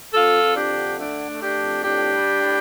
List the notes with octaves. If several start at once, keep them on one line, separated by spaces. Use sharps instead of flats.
F2 F4 A4
F2
D4 G4
D3
A3 D4
A3
D4 G4
F2
A2 D4 G4
G3
A2